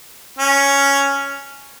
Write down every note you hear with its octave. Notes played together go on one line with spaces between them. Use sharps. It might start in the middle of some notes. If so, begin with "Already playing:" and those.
C#4